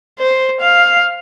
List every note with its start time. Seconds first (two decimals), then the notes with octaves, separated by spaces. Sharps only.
0.19 C5
0.61 F5